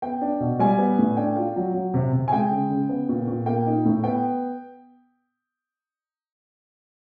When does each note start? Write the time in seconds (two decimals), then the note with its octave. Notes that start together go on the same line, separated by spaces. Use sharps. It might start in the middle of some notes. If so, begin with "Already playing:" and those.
0.02 B3 G5
0.21 D4
0.40 B2
0.59 G3 G#5
0.79 B3
0.98 A2
1.17 D4 G5
1.36 F4
1.56 F#3
1.74 F#3
1.94 C3
2.13 C3
2.28 G#5
2.32 G#3 G5
2.51 C#3
2.70 C#3
2.89 B3
3.09 A#2
3.27 A#2
3.46 A#3 G5
3.66 D#4
3.85 A2
4.04 B3 G5